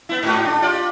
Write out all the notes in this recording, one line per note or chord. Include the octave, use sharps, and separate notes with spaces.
B3 E4
G#2 F#4
D4
F4 G4 D5